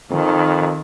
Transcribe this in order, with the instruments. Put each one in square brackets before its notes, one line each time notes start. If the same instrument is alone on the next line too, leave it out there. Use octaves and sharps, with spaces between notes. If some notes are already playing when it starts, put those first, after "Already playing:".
[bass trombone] F2 [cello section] D#3